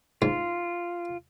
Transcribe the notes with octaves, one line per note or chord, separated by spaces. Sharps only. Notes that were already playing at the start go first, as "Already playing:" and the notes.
G#2 F4